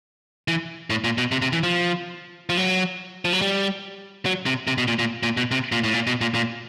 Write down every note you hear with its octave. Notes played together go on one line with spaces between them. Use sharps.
E3
A2
A#2
B2
C3
C3
E3
F3
F3
F#3
F3
F#3
G3
F#3
C3
C3
B2
A#2
A#2
A#2
B2
C3
A#2
A2
A#2
B2
A#2
A#2